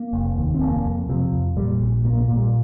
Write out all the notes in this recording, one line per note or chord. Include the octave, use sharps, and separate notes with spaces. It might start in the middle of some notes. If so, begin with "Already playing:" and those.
Already playing: A#3
F1
D#2
C4
F1 A#3
F2
C3 F3
F2
A#2 G3
A#1
A#2 A#3
A#3
A#2
G3